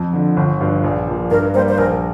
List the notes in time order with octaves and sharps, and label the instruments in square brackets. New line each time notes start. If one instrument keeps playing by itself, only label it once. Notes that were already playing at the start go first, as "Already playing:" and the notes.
Already playing: [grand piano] F2
D3 F3
G1
G2 F3
A#1
A#2 F3
[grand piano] G2 [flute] A#4
[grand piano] G3 A#3 [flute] C5
[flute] C5
[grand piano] A#1 [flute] A#4